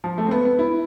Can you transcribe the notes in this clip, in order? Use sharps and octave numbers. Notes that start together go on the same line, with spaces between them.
F3
A3
C4
B3
B3
E4